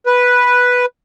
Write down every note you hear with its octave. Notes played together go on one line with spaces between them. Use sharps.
B4